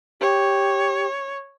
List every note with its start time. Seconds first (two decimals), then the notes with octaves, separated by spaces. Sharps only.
0.21 G4 C#5